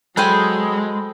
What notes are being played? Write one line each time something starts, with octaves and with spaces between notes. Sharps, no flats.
F#3 G#3 G#4 A4 C5 G5 G#5 B5